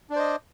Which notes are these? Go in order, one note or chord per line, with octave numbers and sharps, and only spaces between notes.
D4 C5 D5 D#5